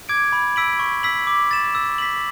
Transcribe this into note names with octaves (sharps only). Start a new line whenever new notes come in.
D6 G#6 D7
B5
E6 B6 D7 F#7
C#6
E6 B6 F#7
D6
A6 E7
E6
B6 F#7